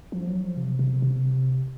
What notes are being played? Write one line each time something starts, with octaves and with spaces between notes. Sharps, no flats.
F3
F#3
F3
C3
C3
C3